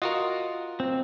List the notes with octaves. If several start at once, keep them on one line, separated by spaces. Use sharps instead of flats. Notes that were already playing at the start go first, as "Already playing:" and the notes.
F4 F#4 A#4 D#5 D#6 F#6
C4